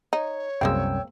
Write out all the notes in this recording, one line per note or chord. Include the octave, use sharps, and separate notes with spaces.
D#4 C#5
C2 F#2 G#3 A#3 C4 G5 E6